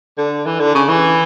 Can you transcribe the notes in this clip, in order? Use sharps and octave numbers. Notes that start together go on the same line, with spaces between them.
D3
E3
D3
C#3
E3